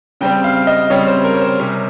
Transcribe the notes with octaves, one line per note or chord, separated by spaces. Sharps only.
C#3 G3 C4 G5
F5
D#5
C#3 G3 C4 C#5
C5
A#4
C#5
C5
C3 G3 C#4